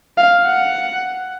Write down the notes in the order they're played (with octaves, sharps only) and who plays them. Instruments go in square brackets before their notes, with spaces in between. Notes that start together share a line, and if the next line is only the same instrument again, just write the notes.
[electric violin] F5
F#5